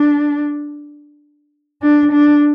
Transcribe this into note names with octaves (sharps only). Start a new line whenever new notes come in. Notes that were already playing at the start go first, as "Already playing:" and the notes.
Already playing: D4
D4
D4